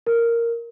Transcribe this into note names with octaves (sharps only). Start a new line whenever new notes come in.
A#4